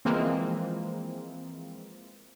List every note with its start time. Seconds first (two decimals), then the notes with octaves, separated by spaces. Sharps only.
0.05 E3 F3 G#3 A#3 C4